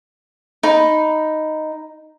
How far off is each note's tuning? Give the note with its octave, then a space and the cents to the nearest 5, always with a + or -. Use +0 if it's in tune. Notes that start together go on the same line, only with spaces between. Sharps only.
D#4 +0 B5 +5